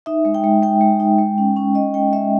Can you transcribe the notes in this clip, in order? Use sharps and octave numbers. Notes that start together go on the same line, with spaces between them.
D#4 E5
G#3
G5
G#3
G#3 G5
G#3
D#4
G#3
C#4
C#4
G#3 D#5
G#3 G5
G#3 E5